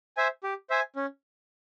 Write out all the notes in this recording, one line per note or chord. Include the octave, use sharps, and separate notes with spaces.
C5 E5 G#5
G4
C5 E5 G#5
C#4